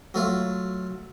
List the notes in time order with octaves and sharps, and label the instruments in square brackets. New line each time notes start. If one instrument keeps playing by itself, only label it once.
[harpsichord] F#3 A3 F4